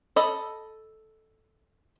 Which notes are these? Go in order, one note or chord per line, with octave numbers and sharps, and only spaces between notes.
A4 D#5 B5